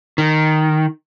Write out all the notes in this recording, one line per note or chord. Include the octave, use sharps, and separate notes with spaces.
D#3